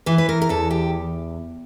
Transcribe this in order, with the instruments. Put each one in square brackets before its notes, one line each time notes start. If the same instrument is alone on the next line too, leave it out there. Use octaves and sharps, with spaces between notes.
[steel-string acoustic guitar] E3 B4
B4
A#4
A#4
E2 A4
G4